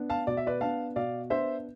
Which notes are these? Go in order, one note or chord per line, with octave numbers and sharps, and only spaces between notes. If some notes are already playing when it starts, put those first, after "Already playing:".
Already playing: B3 D4
F5 A5
B2 D5
E5
B4 D5
B3 D4 F5 A5
B2 D5 F5
B3 D4 C5 E5